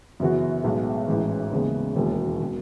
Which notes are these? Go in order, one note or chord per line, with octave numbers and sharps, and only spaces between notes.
F#2 C#3 E3 B3 F#4
B1 A2 G#3 B3 F#4
A1 G#2 E3
D#2 C#3 E3 G#3 B3
E1 D#2 D#3 F#3 C#4
B2 F#3